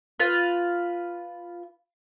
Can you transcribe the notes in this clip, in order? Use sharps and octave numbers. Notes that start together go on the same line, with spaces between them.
F4 B4